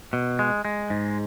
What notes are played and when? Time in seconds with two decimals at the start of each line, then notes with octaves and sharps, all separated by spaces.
0.13 B2
0.39 G#3
0.65 G#3
0.90 G#2